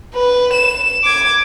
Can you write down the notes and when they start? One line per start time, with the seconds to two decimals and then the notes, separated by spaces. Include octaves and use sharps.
0.14 B4
0.53 E7
1.04 D6 G#6